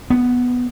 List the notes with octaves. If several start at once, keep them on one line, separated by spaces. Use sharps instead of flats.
B3